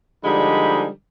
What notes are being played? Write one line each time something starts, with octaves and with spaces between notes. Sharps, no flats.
D3 F3 G3 G#3 D#4 B5